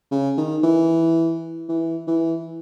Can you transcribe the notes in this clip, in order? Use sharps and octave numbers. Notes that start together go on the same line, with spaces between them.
C#3
D#3
E3
E3
E3